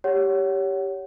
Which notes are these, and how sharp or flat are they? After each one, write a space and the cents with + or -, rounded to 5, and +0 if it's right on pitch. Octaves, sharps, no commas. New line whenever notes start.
G4 +0 C#5 +15 F#5 +15